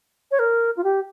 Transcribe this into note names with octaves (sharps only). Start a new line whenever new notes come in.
C#5
A#4
F4
G4